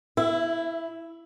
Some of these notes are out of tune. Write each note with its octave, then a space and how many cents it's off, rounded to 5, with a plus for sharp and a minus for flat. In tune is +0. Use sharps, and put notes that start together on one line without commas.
E4 +0 E5 +30